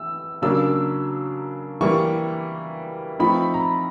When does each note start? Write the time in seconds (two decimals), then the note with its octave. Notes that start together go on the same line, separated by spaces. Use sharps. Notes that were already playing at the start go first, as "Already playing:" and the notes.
Already playing: E3 E6
0.42 C#3 F#3 A#3 D4 E6
1.81 E3 G3 A#3 C#6
3.19 F3 A3 C4 D#4 B5
3.54 A#5